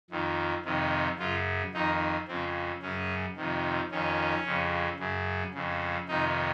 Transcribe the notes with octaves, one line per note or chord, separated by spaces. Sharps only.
F2 D#3
F2 C3 D#3
F#2 C#3 F4
F2 D#3 D#4
F2 C#3 C4
F#2 C#3 C#4
F2 C3 D#3
F2 D#3 C#4
F2 C#3
F#2 C#3
F2 C#3
F2 C3 D#3 D#4